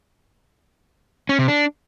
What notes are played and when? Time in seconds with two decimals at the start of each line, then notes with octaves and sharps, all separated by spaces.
1.29 C#4
1.39 C3
1.48 D4